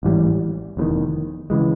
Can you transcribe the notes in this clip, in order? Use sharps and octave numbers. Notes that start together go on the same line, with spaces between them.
A1 G#2 E3 G3
F1 E2 C3 D#3
C#3 E3 G#3